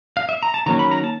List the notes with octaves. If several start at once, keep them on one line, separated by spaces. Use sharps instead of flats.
F5
E5
A#5
A5
D#3 F#3 A#3 C#4 A#5
B5
A#5
A5